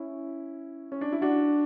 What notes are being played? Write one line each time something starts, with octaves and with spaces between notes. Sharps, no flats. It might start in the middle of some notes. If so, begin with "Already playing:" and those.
Already playing: C#4 E4
C#4
D4
E4
D4 F#4